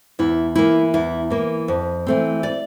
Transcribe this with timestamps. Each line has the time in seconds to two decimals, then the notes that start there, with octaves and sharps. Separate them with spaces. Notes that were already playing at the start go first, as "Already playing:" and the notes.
0.19 E2 E4
0.55 E3 A#3 E4
0.94 E2 E4
1.30 E3 A#3
1.68 F2
2.07 E3 A3 C4
2.43 D5